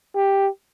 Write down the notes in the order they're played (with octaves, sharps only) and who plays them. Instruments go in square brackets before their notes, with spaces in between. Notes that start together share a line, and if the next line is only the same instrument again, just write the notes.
[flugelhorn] G4